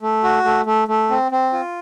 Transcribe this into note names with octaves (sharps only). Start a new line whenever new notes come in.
A3
F#4
A3
A3
A3
C4
C4
F4